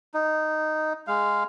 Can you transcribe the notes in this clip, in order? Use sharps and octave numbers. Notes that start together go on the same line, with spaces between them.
D#4
G#3 F5